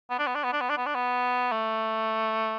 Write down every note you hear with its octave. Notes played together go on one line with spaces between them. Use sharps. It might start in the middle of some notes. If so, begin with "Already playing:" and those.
B3
D4
B3
D4
B3
D4
B3
D4
B3
D4
B3
A3